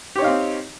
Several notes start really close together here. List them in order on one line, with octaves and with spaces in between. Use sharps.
G4 C#5 D#4 F5 C4